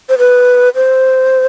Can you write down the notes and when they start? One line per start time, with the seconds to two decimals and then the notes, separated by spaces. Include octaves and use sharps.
0.09 C5
0.18 B4
0.75 C5